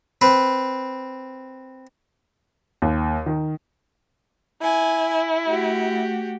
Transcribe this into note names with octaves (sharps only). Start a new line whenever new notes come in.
C4 B4
D#2
D#3
E4 G#5
A3 F#4 G4